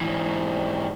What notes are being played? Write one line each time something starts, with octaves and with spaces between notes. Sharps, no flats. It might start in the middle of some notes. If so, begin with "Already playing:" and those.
G#2 E3